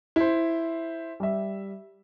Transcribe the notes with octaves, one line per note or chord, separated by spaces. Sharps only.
E4 C5
G3 E5